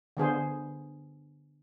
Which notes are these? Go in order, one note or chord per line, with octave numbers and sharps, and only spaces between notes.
D3 B3 G#4 C5